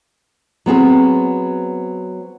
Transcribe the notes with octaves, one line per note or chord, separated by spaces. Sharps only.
F#3 B3 C4 G#4